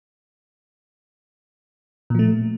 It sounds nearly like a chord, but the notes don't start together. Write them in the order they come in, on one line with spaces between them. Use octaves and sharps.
A#2 F3 A3